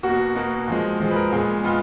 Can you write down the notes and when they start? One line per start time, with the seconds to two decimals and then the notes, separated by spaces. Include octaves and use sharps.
0.03 B2 A#3 F#4
0.35 B2 A#3
0.68 A#2 F3 G#3
1.00 A#2 F3 G#3 G#4
1.11 B4
1.16 A#4
1.32 A#2 G#3 B3 G#4
1.64 A#2 G#3 B3 F4